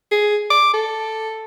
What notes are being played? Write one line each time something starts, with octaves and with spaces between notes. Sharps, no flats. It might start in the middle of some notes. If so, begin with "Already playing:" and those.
G#4
D6
A4